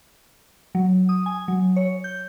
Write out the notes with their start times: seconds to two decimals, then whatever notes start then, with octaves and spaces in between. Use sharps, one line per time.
0.75 F#3
1.09 D#6
1.26 G#5
1.48 F#3
1.76 C#5
2.04 G6